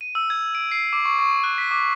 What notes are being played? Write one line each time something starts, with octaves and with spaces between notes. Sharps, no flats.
D#7
E6
G#6
D7
C7
D6
C#6
C#6
F#6
B6
D6